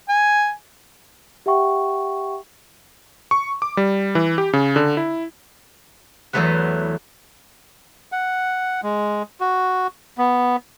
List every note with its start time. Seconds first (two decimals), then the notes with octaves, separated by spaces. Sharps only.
0.09 G#5
1.46 G4 E5 F#5 G5 C#6
3.31 C#6
3.62 D6
3.77 G3
4.15 E3
4.38 G4
4.53 C#3
4.76 D3
4.97 E4
6.33 E2 E3 F#3 A3 B4 F#5
8.12 F#5
8.83 G#3
9.41 F#4
10.18 B3